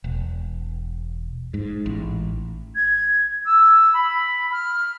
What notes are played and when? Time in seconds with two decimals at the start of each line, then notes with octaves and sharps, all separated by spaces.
0.04 E1
1.54 G#2
1.86 A1
2.75 G#6
3.45 E6
3.93 B5
4.52 F6